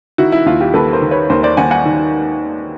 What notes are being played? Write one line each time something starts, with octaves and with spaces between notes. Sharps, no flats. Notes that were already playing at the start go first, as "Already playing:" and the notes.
D#3 E4 F#4
E4
D#2 F4
F4 G4
D#2 A4 B4
A#4 C5
D#3
B4 C#5
D#2 A#4 C5
C5 D5
D#2 F#5 G#5
F#5 G#5
D#3